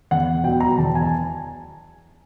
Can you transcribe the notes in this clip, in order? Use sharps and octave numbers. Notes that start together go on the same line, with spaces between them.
E2 F#5
B2 F#3 G5
A#5
E2 A5
G#5
A5